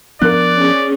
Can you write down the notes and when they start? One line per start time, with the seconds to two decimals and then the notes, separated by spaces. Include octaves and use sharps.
0.22 F3 B3 D4 A#4 D5 F#6
0.57 C#4 G#4